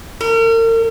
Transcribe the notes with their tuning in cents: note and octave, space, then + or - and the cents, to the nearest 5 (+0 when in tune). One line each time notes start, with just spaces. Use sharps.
A#4 -40